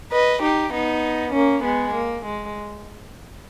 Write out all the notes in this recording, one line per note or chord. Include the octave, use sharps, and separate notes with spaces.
B4 D#5
D#4 G4
B3 D#4
A#3 C#4
G#3 B3
A#3
G#3